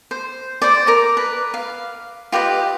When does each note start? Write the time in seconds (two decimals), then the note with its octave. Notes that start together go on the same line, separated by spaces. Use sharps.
0.11 C5
0.62 C5 D5
0.87 A#4 D6
1.17 B4
1.54 F5
2.32 F4 G4 B4 D#5